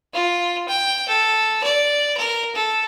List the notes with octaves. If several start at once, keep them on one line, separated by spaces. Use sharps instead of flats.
F4
G5
A4
D5
A#4
A4